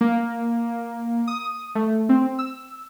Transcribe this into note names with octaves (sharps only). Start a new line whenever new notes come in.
A#3
D#6
A3
C4
E6